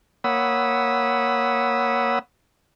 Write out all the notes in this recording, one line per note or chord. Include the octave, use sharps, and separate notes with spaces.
A#3 C#5 F#5 B5 D#6 E6